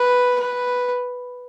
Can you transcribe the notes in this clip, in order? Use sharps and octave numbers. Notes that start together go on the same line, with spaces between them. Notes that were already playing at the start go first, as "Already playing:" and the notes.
Already playing: B4
B4